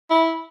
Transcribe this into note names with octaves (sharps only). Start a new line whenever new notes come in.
E4